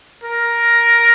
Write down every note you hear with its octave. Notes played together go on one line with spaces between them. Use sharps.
A#4